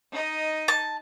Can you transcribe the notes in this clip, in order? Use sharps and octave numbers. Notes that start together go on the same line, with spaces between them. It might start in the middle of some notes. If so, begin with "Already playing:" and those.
D#4 D#5
A5